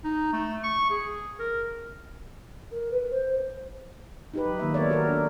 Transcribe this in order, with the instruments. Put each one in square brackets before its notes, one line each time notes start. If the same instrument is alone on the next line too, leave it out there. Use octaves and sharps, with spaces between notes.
[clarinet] D#4
A3
C#6
G#4
A#4
[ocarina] A#4
B4
C5
[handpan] D#4 G4 B4
F#3
D#3 A#3 E5
B3 A4 A#4 C#5 D5
F#4 A4 A#4
D4